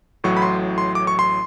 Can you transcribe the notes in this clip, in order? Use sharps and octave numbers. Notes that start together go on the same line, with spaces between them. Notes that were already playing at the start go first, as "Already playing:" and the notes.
A1 A2 F#3 C#6
B5
C6
C6
D6
C#6
C6